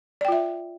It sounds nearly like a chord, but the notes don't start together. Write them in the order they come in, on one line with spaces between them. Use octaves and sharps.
D5 G5 F4 E5